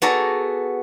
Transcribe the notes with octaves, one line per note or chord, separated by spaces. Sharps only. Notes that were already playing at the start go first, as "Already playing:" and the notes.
B3 F#4 G#4 A4 D5 A#5